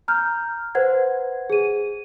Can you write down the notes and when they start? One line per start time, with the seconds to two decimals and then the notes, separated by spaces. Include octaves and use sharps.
0.08 A#5 F6 G6
0.75 B4 C5 F#5 G#6
1.50 G#4 D#7